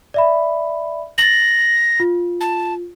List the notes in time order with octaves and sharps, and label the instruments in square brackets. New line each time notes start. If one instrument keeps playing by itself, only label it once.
[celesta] D5 E5 B5
[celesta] A6 F#7 [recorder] A#6
[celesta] F4
[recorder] A5